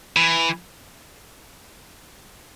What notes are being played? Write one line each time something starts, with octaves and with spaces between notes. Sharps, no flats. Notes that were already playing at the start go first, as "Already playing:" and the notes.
E3